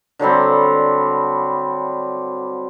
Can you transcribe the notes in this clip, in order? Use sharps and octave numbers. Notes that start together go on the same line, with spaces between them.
D3 F#3 G3 C4